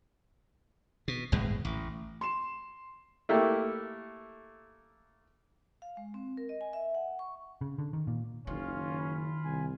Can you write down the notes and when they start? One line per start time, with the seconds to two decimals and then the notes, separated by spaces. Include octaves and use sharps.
1.08 B2
1.32 G1 E2 A2 G#3
1.65 A1
2.21 C6 E7
3.29 A3 A#3 E4 G4 A4
5.82 F5
5.97 G#3
6.14 C4
6.37 A#4
6.49 D#5
6.61 G#5
6.73 E5
6.95 F#5
7.19 C#6
7.61 C#3
7.78 D3
7.93 D#3
8.07 A#2
8.47 F#1 D#3 C#4 F4
8.99 F4 B5
9.44 C2 G#5